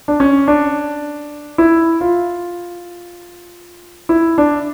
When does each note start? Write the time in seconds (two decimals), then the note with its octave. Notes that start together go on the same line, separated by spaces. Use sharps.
0.08 D4
0.20 C#4
0.48 D4
1.58 E4
2.01 F4
4.09 E4
4.38 D4